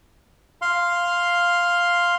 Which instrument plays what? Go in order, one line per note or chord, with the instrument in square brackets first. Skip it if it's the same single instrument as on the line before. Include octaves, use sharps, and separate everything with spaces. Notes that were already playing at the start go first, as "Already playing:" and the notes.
[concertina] F5 C6